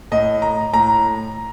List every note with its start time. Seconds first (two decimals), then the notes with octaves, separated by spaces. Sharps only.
0.12 A2 D#5
0.42 A#5
0.73 A2 A#5